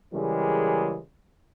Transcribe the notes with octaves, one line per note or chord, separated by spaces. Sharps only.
C#3 E3 G3 G#3 A#4